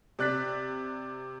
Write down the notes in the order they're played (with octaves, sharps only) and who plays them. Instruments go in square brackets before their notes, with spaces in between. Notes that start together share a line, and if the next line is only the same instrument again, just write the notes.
[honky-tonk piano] C3 D5 F#6 A6 B6